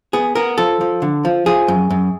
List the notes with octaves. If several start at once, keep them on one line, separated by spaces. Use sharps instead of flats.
B3 G#4
B3 A#4
F3 A4
F3
D3
F3
F3 G#4
F#2
F#2